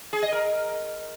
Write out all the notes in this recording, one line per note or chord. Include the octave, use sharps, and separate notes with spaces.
G#4
D#5
A#4